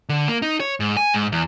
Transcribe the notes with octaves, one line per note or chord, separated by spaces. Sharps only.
D3
A#3
D#4
C#5
G#2
G#5
G#2
E2